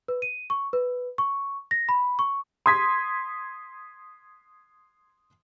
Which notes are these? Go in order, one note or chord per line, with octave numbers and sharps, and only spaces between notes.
B4
D#7
C#6
B4
C#6
A#6
B5
C#6
C6 D#6 G#6 B6